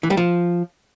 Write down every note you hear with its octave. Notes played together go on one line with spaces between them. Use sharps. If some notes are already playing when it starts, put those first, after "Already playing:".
E3
G3
F3